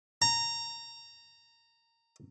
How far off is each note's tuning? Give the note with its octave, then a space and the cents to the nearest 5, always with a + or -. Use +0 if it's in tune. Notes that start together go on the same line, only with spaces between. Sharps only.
A#5 -15